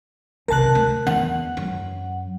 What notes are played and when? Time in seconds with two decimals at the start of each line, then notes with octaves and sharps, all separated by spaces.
0.48 B1 C3 A#4 A5 F#6
0.75 D2
1.07 E2 F#5
1.57 F#2